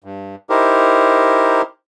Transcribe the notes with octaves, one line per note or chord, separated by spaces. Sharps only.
G2
D#4 E4 G4 A#4 C5